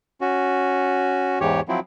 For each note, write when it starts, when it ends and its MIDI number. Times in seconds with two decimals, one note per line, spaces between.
0.21 1.39 61
0.21 1.39 66
1.41 1.61 40
1.41 1.61 44
1.41 1.61 52
1.41 1.61 67
1.41 1.61 73
1.68 1.80 53
1.68 1.80 54
1.68 1.80 60
1.68 1.80 64